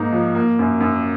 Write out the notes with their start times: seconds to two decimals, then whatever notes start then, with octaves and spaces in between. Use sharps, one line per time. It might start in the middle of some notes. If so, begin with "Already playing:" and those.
Already playing: G#2 A#3 D#4
0.12 F3
0.35 A#3
0.59 F#2
0.80 F#2